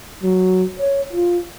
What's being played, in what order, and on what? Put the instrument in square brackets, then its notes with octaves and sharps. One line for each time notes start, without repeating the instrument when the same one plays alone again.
[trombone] F#3
C#5
F4